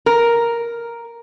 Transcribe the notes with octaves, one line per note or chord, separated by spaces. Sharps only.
A#4